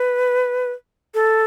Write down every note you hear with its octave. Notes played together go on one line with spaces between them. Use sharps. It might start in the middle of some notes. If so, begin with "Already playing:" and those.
Already playing: B4
A4